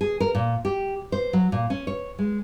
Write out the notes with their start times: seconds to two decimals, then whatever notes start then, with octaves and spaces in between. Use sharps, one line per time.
0.01 G#4
0.20 A#4
0.35 A#2
0.65 G4
1.12 C5
1.33 F#3
1.52 A#2
1.70 C#4
1.87 C#5
2.19 G#3